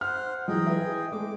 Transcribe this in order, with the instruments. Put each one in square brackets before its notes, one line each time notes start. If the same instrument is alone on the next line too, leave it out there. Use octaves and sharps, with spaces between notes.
[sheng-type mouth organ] C5 F#5 [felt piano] F6
[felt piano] E3 F#3 [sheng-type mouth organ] G#4 D#5 G5
[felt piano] B4 E5
[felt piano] G#3 A3 [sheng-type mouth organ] D6